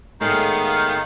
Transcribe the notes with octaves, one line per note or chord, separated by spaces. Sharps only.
A2 D#3 G#3 B3 F5 F6